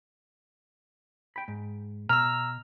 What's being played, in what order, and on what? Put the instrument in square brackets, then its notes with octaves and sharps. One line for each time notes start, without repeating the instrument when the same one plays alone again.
[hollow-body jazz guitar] G5 B5
G#2
[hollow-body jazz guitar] B2 [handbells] A#5 E6 [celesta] F6